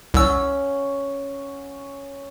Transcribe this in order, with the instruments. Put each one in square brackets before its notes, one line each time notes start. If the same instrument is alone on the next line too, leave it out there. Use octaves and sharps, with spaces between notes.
[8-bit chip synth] C2 E6 [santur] C#4 F#5